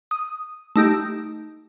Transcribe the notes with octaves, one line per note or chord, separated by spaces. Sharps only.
D#6
A3 D#4 G4